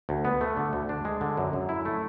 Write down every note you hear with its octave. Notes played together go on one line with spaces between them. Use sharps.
D2
B3
A3
D3
D2
D4
G#3
D3
F#2
F#2
E4
A3